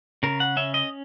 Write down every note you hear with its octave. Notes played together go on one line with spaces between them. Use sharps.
C#3 A#4
F#5
C#4 E5
D#5